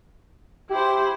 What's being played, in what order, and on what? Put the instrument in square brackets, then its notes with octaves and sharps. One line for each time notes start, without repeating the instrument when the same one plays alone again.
[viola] E4 C5 [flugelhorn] G4